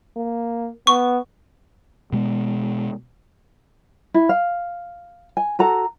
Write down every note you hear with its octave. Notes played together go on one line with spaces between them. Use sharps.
A#3
B3 C#6
B2 G#3 B3
E4
F5
G#5
F#4 A4 A#5